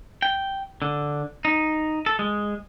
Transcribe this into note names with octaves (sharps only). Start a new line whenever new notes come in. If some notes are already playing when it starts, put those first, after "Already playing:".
G5
D3
D#4
A4
G#3